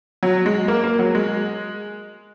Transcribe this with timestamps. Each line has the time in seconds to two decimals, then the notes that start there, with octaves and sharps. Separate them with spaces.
0.23 F#3
0.46 G#3
0.68 A#3
0.84 A#3
0.99 F#3
1.15 G#3